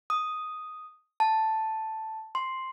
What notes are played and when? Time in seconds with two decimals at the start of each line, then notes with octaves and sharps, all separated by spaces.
0.10 D#6
1.20 A5
2.35 C6